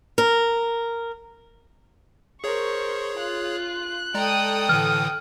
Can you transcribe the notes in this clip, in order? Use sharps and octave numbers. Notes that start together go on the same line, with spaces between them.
A#4
G#4 A#4 C5 C#5 C#6
F4 F#6
G#3 A4 D5 G5 A#5 D#6
A2 D3 E3 F6